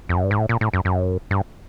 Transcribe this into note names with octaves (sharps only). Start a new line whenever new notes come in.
F2
F#2
G2
G#2
A2
A#2
A2
F#2
F#2
G2